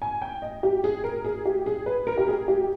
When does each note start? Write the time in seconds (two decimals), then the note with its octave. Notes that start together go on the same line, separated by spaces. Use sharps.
0.02 G#5
0.22 G5
0.42 D#5
0.63 G4
0.84 G#4
1.04 A#4
1.24 G#4
1.45 G4
1.66 G#4
1.86 B4
2.07 A#4
2.17 G4
2.28 G#4
2.48 G4